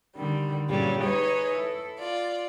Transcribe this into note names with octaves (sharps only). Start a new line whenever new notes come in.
D3 D#3 G3
G2 A#2 C#3 F#3 G3
D#4 G#4 B4 C#5 D#5
E4 A4
F4 D5